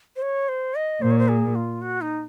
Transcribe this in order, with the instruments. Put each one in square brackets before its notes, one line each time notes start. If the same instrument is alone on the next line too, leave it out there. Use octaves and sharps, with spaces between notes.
[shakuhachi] C5
C#5
C5
D#5
[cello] A#2 [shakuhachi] C5
[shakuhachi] C#5
C5
G#4
F4
F#4
D#4